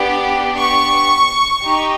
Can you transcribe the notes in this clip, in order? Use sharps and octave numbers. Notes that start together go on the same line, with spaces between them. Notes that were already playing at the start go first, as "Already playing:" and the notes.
Already playing: B3 D4 G4
C#6
D#4 G4